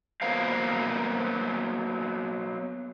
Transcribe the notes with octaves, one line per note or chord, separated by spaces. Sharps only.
F#3 A#3 B3 A#4 C5 F5